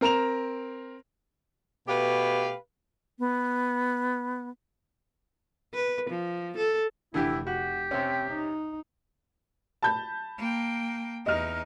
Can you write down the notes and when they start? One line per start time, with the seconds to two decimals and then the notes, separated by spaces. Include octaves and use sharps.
0.01 C4 A#4 A#5 E7 F7
1.88 B2 A3 G4 B4 F5
3.19 B3
5.74 B4
6.10 F3
6.57 A4
7.14 F1 D3 E3 E4 G4
7.47 F#4 G4
7.91 C3 C4 C#4
8.30 D#4
9.82 A5 B5 G6
10.38 A#3 G5
11.26 E2 D#4 D#5 F6